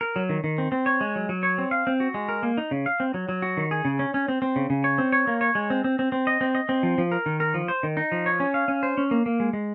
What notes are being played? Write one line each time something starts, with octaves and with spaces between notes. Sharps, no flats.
A#4
F#3
D#3
D#3
C4
C4
C#5
G#3
F#3
F#3
C#5
C4
F5
C4
F#4
G#3
A#4
A#3
D#4
C#3
F5
C4
F#3
F#3
F#4
D#3
G#4
C#3
C#4
C#4
C4
C4
C#3
C#3
C#5
C4
C#5
A#3
C#5
G#3
C4
C4
C4
C4
D#5
C4
D#5
C4
F3
F3
A#4
D#3
A#4
F3
C5
D#3
D#4
F3
C#5
C#4
F5
C#4
C5
C#4
A#3
A#3
G#3
G#3